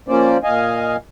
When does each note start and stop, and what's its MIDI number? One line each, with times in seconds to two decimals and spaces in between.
0.08 0.37 53
0.08 0.37 58
0.08 0.37 61
0.08 0.37 72
0.08 0.37 74
0.44 0.96 46
0.44 0.96 75
0.44 0.96 77
0.44 0.96 80